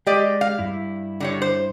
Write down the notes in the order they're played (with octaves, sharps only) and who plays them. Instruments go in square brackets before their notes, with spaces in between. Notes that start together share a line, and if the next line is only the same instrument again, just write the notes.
[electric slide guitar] G#3 [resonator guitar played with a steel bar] G4 D5 D#5
[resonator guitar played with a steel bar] F5
[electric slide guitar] G2 E4
[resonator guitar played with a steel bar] D3 G3 C#5
C5